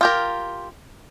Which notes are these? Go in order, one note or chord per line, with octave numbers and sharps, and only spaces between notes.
F4 G4 A#4